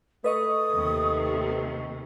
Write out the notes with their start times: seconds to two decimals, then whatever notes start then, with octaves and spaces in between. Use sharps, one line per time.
0.24 A3 B4 D#5 C#6 D#6
0.73 D#2 C3